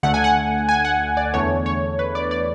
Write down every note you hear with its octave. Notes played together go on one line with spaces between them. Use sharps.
D2 D3 A3 F#5
G#5
F#5
G#5
F#5
D5
E2 D3 A3 C#5
C#5
B4
D5
D5